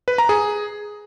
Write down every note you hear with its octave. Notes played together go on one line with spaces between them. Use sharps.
B4
A#5
G#4